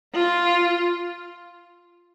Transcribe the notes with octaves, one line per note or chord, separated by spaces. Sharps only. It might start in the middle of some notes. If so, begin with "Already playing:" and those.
F4